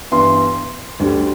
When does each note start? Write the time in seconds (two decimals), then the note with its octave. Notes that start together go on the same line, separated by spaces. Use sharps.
0.11 G2 E3 B3 C6
1.00 D2 D3 G3